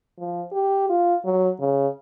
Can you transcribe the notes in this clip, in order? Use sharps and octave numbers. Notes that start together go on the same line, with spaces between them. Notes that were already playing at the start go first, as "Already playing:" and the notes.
F3
G4
F4
F#3
C#3